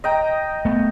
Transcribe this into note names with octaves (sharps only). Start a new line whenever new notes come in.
D#5 G5 A#5
A3 B3